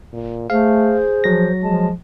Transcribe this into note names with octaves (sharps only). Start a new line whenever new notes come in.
A#2
A3 G#4 C5 F5
F3 F#3 A#6
F3 G#3 A5